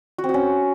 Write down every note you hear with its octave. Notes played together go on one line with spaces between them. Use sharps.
F#4
C4
F#4
C#4